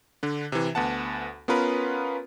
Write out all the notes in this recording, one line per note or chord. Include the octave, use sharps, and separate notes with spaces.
D3 D4
C3 E3
D2 B3 F#5 A5
B3 C#4 F4 A#4 B4